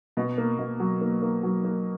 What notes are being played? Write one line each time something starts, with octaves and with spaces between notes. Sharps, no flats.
B2
A#3
B2
F#3
A#3
A#3
F#3
A#3